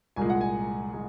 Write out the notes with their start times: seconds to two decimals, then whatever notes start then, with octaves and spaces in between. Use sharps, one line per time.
0.16 C2 A#2 G#3 G#5
0.30 F#5
0.41 G#5
0.94 G#3